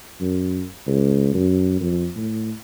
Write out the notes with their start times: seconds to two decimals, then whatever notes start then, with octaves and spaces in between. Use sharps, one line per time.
0.21 F#2
0.87 C#2
1.34 F#2
1.81 F2
2.17 A2